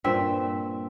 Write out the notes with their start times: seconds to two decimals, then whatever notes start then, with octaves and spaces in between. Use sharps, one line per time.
0.04 G2 A#2 C4 E5